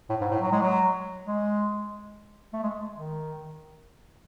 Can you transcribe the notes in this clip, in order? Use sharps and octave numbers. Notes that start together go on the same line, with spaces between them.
A2
G#2
A2
F#3
G#3
F#3
G#3
A3
G#3
D#3